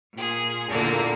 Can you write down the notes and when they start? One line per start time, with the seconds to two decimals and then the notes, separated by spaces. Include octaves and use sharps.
0.14 A#2 G#4
0.69 E2 A#2 D3 A#3